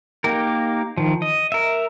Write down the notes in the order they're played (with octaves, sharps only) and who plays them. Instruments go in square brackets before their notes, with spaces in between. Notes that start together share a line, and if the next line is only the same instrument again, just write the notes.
[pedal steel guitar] A#3 D#4 G4 A#4
D#3 F3
D#5
A#4 E5